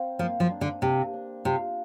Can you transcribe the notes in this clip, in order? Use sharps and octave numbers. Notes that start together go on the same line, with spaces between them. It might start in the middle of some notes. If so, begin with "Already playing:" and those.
Already playing: C4 A#4 F5
F3 A#3
F3
D4
D3
C3 D4
D4
C3 F4